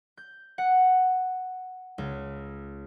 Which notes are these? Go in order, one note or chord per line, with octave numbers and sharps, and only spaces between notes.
G6
F#5
C#2